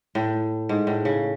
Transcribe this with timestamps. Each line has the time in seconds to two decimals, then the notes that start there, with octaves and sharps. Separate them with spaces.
0.15 A2
0.69 G#2
0.87 A2
1.05 C#3